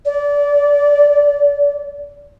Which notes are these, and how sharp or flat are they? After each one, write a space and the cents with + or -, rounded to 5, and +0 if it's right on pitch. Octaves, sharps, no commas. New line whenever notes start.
D5 -25